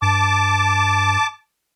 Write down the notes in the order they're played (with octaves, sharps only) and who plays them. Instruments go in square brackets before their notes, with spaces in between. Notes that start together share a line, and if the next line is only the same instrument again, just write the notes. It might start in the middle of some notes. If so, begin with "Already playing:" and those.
[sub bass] G2 [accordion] A5 D6